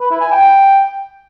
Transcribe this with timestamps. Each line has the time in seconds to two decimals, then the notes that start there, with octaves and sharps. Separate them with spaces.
0.01 B4
0.11 E4
0.21 G#5
0.31 G5